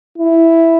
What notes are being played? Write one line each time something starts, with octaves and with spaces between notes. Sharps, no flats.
E4